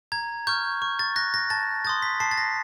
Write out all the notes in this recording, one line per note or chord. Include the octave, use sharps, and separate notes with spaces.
A#5 G#6
C#6 F6 G6
C#6
A6
F#6 A#6
A#6
A5 A6
C6 D#6 G6 A6
B6
A5 C7
A6
A#6